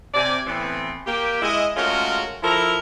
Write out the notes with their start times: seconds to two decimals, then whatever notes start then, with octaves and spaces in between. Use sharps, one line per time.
0.14 C3 D5 G#5
0.47 A2 E3 B3 C4
1.07 A#3 G4
1.42 G#3 E4 D#5
1.77 G#3 A3 C#4 F4 F#4 A#4
2.43 F3 E4 A4 A#4 A#5